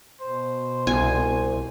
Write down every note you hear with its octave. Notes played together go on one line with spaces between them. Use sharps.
B2 C5
C2 G#5